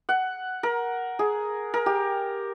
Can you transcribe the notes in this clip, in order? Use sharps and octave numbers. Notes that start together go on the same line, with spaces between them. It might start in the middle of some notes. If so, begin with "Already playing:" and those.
F#5
A#4
G#4
A#4
G4